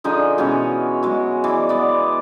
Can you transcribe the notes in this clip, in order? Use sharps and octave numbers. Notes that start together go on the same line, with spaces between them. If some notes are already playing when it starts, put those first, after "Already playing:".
D3 F3 D#4 G#4
B2 E3 G#3 C#4
F#3 G#3
E3 D5
B3 D5